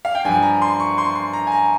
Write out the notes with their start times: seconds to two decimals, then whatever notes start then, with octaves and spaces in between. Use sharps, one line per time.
0.05 F5
0.15 G5
0.25 G2 F3 G#5
0.42 A#5
0.62 C6
0.80 C#6
0.98 C6
1.15 C6
1.33 A#5
1.47 G#5
1.52 A#5